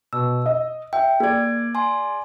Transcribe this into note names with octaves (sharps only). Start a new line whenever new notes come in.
B2 E6
D#5
E5 G5
A#3 G#4 D5 G#6
G#5 C6